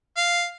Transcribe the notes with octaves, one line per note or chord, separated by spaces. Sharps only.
F5